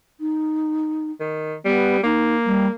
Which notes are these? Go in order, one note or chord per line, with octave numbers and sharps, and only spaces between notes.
D#4
D#3
G3 B3
A#3 D#4
G3